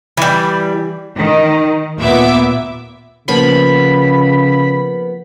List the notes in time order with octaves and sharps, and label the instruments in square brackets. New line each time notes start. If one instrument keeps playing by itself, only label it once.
[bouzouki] E3 G3
[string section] D#3
D#2 A#2 B3 E5 D6
[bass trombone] C#3 [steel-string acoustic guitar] F3 A#3 B3 [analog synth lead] B5